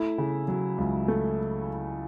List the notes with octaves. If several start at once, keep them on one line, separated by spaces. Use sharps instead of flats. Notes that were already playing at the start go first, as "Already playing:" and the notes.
Already playing: A3 E4
C#3
F#3
C#2
A3